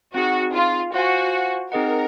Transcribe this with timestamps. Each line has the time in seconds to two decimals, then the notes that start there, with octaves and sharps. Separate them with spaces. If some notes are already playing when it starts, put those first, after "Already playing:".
0.14 C4 D#4 F#4 G#4
0.54 F4
0.93 F4 F#4 C5 F5 G#5
1.72 C4 D#4 G#4 A#4 D#5 F#5